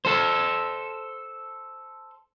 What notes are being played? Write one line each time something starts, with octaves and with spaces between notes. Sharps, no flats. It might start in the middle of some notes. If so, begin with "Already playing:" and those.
A4 C5